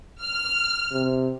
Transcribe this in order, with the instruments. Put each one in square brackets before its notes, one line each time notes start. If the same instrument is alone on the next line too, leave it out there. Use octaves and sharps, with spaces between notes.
[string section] F6
[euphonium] C3